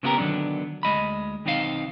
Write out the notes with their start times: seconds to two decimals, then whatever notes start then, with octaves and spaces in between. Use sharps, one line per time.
0.03 C#3 A#3 B3 E4 G4 A#4
0.17 D3 D#3 F#3 B3 C#4 D4
0.83 D2 G#3 D#5 B5
1.45 B1 D#3 C4 D#4 E4 F5